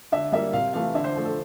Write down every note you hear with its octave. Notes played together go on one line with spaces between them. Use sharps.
D3 E5
G3 A#3 E5
C3 F5
E3 A3 F5
D3 E5
C5
F3 A3
A4